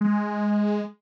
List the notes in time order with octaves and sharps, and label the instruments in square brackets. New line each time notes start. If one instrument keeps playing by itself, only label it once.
[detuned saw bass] G#3